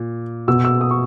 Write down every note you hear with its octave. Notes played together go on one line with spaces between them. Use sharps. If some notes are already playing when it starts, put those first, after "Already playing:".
Already playing: A#2
B2 E6
E6
D#6
C#6